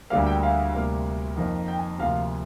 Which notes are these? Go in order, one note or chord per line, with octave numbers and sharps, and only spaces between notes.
D2 D3 G3 A#3 F5
G5
F5
D2 C3 G3 A#3
F2 D#3 A#3
G5
G#5
D2 C3 F3 A#3 F5